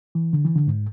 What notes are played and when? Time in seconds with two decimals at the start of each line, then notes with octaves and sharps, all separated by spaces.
0.15 E3
0.33 D3
0.45 E3
0.56 D3
0.67 G#2